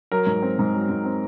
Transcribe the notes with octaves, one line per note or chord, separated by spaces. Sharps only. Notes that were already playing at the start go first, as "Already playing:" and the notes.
F#3 A#4
G#2
C4
G#2
F#3
G#2
C4